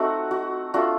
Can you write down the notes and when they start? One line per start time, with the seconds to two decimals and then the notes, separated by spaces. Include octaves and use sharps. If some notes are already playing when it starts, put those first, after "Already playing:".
Already playing: A3 C4 D#4 F#4
0.31 F#4
0.74 A3 D4 F4 F#4